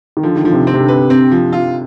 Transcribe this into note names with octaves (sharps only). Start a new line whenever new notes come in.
D#3
D3 F3
D#3
D3 F3
C3
C4
C3
D3
B4
C4
F3
F4